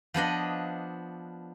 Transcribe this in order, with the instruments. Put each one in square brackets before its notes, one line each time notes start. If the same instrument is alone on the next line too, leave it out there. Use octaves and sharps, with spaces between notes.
[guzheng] F3 B3 D4 D#5